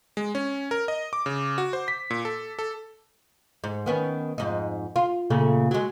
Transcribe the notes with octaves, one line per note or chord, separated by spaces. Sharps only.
G#3
C#4
A#4
D#5
D6
C#3
F#4
C5
B6
A#2
A4
A4
G#2
D#3 B3 C#4
F2 G#2 D#4
F4
A#2 C#3 A3
F#3 G#3